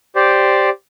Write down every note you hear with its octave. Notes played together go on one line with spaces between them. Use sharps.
G4 C5 D5